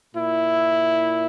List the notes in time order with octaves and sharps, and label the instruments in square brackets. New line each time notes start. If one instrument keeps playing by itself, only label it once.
[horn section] A#2 E4